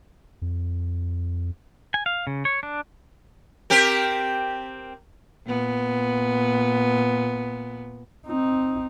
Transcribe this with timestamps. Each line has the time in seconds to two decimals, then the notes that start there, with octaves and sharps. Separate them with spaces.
0.42 F2
1.94 G#5
2.06 F5
2.27 C#3
2.45 C#5
2.63 D4
3.70 C4 G4 A#4
5.46 A#2 B3
8.26 C4 D#4